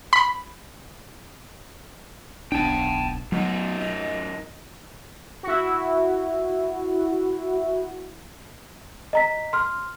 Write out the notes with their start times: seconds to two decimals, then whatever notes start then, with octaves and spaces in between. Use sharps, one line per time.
0.13 B5
2.52 D1 B1 B3 D4 G5 A5
3.32 F#2 F#3 B3 D#4
3.79 D#5
5.43 E4 F#4
9.13 D#5 A#5 B6
9.53 C6 F6